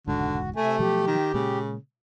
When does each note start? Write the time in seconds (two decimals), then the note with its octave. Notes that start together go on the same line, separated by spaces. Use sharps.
0.08 E1 C#2 G#2 D3 F#4
0.56 C3 A3 E5 G#5
0.79 B2 F3 F#3 G4
1.07 D#3
1.34 A#2 C#3 G#3 A#3